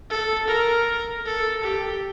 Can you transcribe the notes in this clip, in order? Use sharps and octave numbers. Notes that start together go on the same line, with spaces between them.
A4
A#4
A4
G4